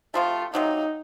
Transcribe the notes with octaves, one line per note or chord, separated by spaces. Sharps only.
C3 F3 A3 F4
C3 F#3 A#3 D#4